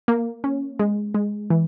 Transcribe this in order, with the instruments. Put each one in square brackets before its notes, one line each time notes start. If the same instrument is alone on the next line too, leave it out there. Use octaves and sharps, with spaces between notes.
[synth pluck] A#3
C#4
G#3
G#3
E3